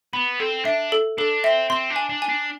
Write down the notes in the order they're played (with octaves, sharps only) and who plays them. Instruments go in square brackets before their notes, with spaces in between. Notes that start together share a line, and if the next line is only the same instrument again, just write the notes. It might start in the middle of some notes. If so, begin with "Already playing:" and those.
[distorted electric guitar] B3 [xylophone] B5
[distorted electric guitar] C4 [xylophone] A4
[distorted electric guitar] D4 [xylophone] E5
[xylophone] A4
[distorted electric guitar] D4 [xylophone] A4
[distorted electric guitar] C4 [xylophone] E5
[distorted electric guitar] C4 [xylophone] C6
[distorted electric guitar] D4
[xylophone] G#5
[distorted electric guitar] D4
[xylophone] G#5
[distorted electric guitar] D4